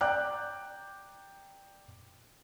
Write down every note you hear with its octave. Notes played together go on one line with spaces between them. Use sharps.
D5 G5 A#5 D6 F#6